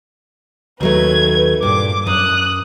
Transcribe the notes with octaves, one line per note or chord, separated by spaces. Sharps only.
D#2 F#3 A3 B4 G#6
G2 A#2 D6
F#2 D#6 F#6